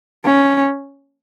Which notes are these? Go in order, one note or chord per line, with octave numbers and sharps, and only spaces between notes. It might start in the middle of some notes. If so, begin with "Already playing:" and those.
C#4